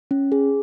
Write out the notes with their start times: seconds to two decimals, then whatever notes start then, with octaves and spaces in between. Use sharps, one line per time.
0.11 C#4
0.32 G#4